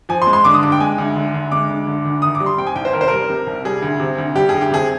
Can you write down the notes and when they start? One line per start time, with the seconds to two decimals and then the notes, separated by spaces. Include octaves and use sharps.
0.09 F3 G#5
0.22 C6
0.27 G#3
0.33 C6
0.44 D3 D6
0.54 D#6
0.62 G2 D6
0.72 G5
0.80 G#3 G#5
0.98 D2
1.16 D3
1.34 D2
1.52 G#3 D6
1.69 D2
1.87 D3
2.05 D2
2.22 D#3 D#6
2.35 D6
2.40 G3
2.46 C6
2.58 C3 G5
2.67 G#5
2.76 C2 G5
2.85 C5
2.93 D#3 A#4
3.01 C5
3.08 G3 A#4
3.30 C3
3.47 C2
3.65 G3 G#4
3.82 D2
4.00 C3
4.18 D2
4.35 G3 G4
4.49 D2 G#4
4.61 G4
4.71 C3 G#4